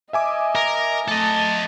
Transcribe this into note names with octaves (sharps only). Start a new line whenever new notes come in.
D#5 E5 G#5 D6
A#4
A3 A4 D#5 A5